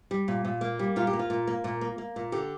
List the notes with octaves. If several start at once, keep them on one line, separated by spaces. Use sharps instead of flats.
G3
A#2
A#2
A#3
G3
A#2 F4
G4
A#3
F4
A#2
A#3
A#2
A#3
A#3
A#2
D3 G4